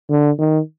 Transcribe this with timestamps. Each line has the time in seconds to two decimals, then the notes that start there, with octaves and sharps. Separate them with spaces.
0.10 D3
0.38 D#3